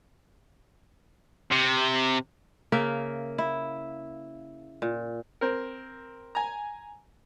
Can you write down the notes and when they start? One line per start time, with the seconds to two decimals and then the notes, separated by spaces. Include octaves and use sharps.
1.51 C3
2.72 C#3 A#3 A#4 E5
3.38 E4
4.82 A#2
5.41 C4 A#4
6.35 G#5 A#5